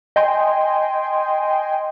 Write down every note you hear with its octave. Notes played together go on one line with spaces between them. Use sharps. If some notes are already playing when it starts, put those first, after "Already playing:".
D#5 G5 G#5 C6